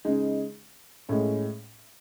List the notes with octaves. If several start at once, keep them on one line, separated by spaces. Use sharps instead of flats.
C#3 G#3 D#4
A2 G#3 C#4